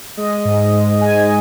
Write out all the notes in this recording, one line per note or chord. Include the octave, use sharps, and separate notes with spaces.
G#3 D#5
G#2
G#3
G#2 G#5